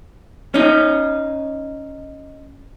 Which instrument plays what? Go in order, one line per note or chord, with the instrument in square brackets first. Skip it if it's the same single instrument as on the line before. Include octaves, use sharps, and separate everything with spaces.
[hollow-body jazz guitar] C#4 D#4